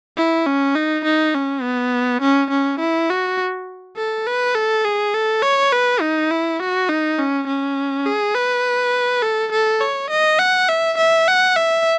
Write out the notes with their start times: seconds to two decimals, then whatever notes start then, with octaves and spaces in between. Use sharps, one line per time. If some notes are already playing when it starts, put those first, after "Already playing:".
0.18 E4
0.47 C#4
0.75 D#4
1.05 D#4
1.35 C#4
1.63 B3
2.22 C#4
2.51 C#4
2.80 E4
3.10 F#4
3.97 A4
4.27 B4
4.55 A4
4.85 G#4
5.14 A4
5.43 C#5
5.73 B4
6.01 D#4
6.31 E4
6.60 F#4
6.89 D#4
7.19 C#4
7.48 C#4
8.06 G#4
8.35 B4
9.23 A4
9.52 A4
9.81 C#5
10.10 D#5
10.39 F#5
10.69 E5
10.98 E5
11.28 F#5
11.56 E5